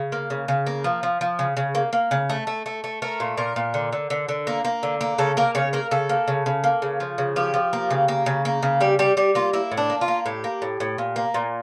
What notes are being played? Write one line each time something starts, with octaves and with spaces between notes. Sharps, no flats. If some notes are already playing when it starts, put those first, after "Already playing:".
Already playing: C#3
A#3
C#3
C#3
A#3
F3
F3
F3
C#3
C#3
A#3
A#3
C#3
A3
A3
A3
A3
A3 A#4
A#2
A#2 A#4
A#2
D3
D3
D3
D3
A#3
A#3
D3
A#3
C#3 A4
A#3 A#4
C#3 C#5
A#3 A#4
C#3 A4
A#3
C#3
C#3
A#3
C#3
F3
C#3
F3 G4
F3
A#3
C#3
A#3
C#3
A#3
C#3
G3 G4
G3 G4
G3 G4
A#3 F4
A#3 E4
A2
D4
A#3
F4
A#3
A2 G4
A#3
A2
A2
A#2
A#3
A#2